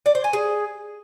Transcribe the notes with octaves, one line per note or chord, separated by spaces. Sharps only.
D5
C5
G#5
G#4